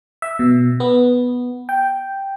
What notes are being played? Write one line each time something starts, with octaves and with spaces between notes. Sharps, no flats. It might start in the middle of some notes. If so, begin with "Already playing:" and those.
E5
B2
B3
G5